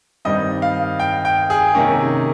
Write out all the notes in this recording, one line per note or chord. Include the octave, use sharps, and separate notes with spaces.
G2 D#3 G3 C4 D#5
F5
G5
G5
G#4
C3 D#3 A#3 C#4